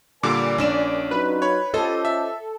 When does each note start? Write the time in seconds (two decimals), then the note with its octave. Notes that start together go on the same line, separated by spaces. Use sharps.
0.23 A#2 D3 G3 A#4 D5 G#5 D6
0.58 A#1 C#4 D4 E7
1.11 F#3 D#4 F4 B4
1.42 C#5 B5
1.74 C#4 F4 G4 A4 C5 D#5
2.05 E5